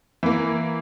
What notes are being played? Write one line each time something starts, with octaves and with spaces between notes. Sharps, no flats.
E3 A#3